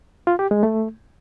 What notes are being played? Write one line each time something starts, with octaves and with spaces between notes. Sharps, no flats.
F4
G4
G#3
A3